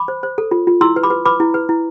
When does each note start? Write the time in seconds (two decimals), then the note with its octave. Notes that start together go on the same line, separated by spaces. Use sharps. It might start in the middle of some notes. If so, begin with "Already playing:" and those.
Already playing: B5 D6
0.08 C5
0.23 C5
0.38 A4
0.51 F4
0.67 F4
0.81 E4 C6 E6
0.96 B4
1.03 B5 D6
1.10 B4
1.25 B4 B5 D6
1.40 E4
1.54 B4
1.69 E4